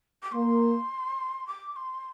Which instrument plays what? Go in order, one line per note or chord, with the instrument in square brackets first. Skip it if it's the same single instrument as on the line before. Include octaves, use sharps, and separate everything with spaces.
[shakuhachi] D6
[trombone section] A#3 [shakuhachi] C6
[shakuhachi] D6
C6